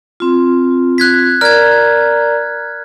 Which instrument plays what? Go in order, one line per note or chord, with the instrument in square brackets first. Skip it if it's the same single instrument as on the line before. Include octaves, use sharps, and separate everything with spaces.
[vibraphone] C4 F4
[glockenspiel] F#6 G#6 B6
[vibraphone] A#4 D5 A#5 [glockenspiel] F6 G#6